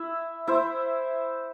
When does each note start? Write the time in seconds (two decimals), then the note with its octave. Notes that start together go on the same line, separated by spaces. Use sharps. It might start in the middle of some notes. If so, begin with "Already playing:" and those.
Already playing: E4 E5
0.47 E4 C5 E5